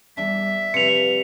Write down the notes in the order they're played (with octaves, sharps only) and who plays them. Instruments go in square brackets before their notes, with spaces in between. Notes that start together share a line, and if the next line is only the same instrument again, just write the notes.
[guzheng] E2 D4 [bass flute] G3 [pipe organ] E5
[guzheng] C3 F3 G3 [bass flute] B4 [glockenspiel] C#7 F7